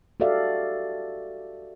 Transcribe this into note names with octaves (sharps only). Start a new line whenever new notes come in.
F#4 G4 A4 D5 E5 F5